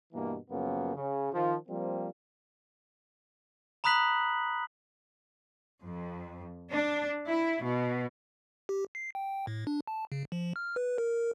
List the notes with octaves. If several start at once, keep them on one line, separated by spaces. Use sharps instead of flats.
G2 B2 E3 A#3
F#2 C#3 F3 A#3 B3
C#3
D#3 F3
F3 G3 A#3 C4
A#5 B5 D#6 F#6 B6 F#7
F2
D4
E4
B2
G4
C7
G5
A2
D4
A5
C#3
F3
F6
B4
A#4